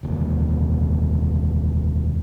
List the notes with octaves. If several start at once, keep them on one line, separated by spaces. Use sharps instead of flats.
F1 D#2